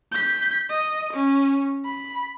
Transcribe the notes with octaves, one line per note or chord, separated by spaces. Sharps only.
G6 B6
D#5
C#4
B5